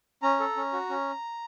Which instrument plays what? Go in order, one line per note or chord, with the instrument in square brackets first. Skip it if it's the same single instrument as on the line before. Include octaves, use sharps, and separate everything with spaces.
[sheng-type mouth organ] C#4 A#5
A4
C#4
F#4
C#4